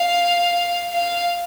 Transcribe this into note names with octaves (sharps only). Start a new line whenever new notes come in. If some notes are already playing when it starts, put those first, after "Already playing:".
Already playing: F5
F5